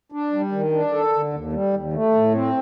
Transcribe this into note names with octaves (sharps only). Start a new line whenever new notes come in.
D4
G3
D#3
D4
A4
D3
D#2
G3
D#2
A3
A2
C4